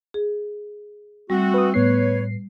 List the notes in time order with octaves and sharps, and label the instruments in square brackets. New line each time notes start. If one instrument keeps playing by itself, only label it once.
[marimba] G#4
[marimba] G3 [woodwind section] A3 C4 F#4
[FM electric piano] B4 D#6
[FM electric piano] A2 B3 C7 [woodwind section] B4 C#5